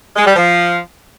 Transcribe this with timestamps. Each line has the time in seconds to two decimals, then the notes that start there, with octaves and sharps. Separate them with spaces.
0.16 G#3
0.26 G3
0.36 F3